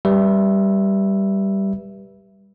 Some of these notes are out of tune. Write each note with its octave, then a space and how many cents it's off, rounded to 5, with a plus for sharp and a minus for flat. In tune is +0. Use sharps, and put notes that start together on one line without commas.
G3 +0 B4 -20 E5 +5